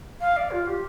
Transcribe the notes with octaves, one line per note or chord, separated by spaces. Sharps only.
F5
D5
F4
G4